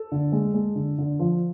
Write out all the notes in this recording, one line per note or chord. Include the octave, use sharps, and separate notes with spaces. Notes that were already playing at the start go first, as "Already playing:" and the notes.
Already playing: A4
D3
G#3
G#3
D3
D3
F3